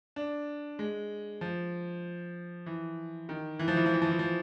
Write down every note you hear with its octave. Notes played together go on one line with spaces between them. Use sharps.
D4
G#3
F3
E3
D#3
E3
F3
E3
F3
E3
F3
E3
F3